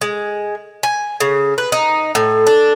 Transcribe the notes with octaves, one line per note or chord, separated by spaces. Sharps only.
G#3
G#5
C#3
B4
D#4
A2
D4